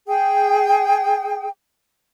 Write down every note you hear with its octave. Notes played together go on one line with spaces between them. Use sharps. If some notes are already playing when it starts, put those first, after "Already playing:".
G#4 G5